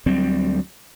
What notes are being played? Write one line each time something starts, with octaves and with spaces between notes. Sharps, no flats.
D2 F#3 G3 C4